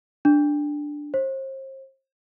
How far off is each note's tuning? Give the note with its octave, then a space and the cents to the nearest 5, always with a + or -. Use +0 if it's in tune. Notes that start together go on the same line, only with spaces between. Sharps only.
D4 +5
C5 +35